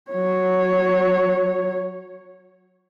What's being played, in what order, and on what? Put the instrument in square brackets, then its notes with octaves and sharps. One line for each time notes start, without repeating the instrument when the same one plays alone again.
[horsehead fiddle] F#3 C#5